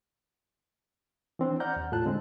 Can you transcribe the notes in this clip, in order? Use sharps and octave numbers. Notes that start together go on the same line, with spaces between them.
E3 C4 D4
D5 F#5 A#5 F6 G6
D#2
A2 F4 A5 F#6
D3 G#3 C4